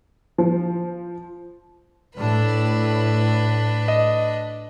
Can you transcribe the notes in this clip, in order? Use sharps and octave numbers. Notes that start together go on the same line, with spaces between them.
F3
A2 D4 B4
D#5